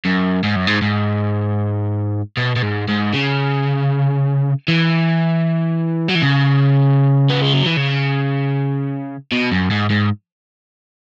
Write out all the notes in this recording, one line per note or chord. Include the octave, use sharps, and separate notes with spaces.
F#2
G#2
F#2
G#2
G#2
B2
B2
G#2
G#2
C#3
E3
F#3
E3
C#3
B3
G#3
F#3
E3
C#3
B2
F#2
G#2
G#2